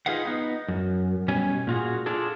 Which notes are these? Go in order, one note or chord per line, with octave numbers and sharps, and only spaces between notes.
D#4 F4 G#4 B4 F5 F#5
B3 D#4
F#2
B2 G3 C#4 C#5 G#5
A#2 F4 F#4 G#4
D4 F4 G#4 A4